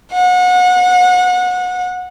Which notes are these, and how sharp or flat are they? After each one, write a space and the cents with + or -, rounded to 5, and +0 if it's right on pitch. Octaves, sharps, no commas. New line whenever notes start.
F#5 -30